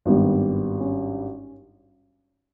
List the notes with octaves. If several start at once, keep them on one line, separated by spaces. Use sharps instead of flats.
G#1 G2 G3 B3
C#4